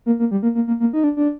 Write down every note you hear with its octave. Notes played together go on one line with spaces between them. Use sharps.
A#3
A#3
G3
A#3
A#3
A#3
A#3
D#4
D4
D4